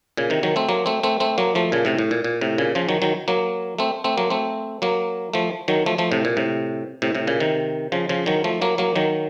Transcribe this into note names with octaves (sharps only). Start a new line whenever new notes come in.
A#2 C#3
C3 D#3
D#3 F#3
A3 C4
F#3 A#3
A3 C4
A3 C4
A3 C4
F#3 A#3
F3 A3
A#2 C#3
A2 C3
A2
A#2
A#2
A2 C3
A#2 C#3
C#3 F3
D#3 F#3
D#3 F#3
F#3 A#3
A3 C4
A3 C4
F#3 A#3
A3 C4
F#3 A#3
F3 A3
D#3 F#3
F3 A3
F3 A3
A2 C3
A#2
A2 C3
A2 C3
A2 C3
A#2 C#3
C3 D#3
C#3 F3
C#3 F3
D#3 F#3
F3 A3
F#3 A#3
F#3 A#3
D#3 F#3